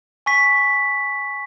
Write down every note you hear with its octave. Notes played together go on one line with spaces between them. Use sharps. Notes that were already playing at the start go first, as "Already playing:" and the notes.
G#5 C#6 B6